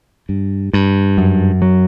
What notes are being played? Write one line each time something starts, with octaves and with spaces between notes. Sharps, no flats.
G2
G2
F#2
F#3